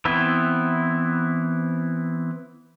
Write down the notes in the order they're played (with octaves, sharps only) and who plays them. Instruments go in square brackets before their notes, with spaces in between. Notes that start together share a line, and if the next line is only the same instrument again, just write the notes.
[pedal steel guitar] E3 B3 C4 E4